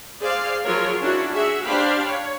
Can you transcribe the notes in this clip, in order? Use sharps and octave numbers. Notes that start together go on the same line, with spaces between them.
G#4 C5 D5 F5
F3 F#3 F4 G#4 A#4 C#5
C#4 D4 E4 F#4
F#4 G#4 E5
D4 G4 C5 F5 G5 B5
C#5